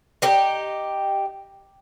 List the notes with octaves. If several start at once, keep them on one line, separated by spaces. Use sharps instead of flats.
D#4 G4